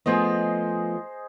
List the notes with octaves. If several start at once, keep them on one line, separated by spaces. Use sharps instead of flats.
F3 A3 B3 G#4 C5 D#5